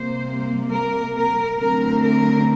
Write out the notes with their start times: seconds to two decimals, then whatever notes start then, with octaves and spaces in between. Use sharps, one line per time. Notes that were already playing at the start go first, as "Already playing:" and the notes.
Already playing: C3 G3 A#3 C5
0.70 A#4
1.15 A#4
1.59 D3 F#3 A3 C4 A#4
2.03 A#4